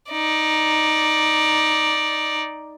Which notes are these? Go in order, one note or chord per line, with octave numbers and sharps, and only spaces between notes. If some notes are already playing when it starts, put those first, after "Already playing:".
D#4 D5